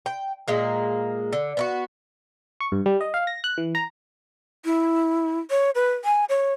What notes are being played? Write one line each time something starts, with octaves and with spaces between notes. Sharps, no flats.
G5
A#2 G#3 A#3
D3
B3 E4 F#4
C#6
G2
G3
D#5
F5
A#6
F#6
E3
A#5
E4
C#5
B4
G#5
C#5